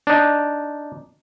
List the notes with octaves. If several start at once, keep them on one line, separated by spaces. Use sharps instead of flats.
D4 D#4